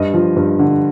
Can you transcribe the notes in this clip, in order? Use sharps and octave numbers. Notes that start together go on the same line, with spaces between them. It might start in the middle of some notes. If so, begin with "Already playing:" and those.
Already playing: G2 D#5
F3
G2
D3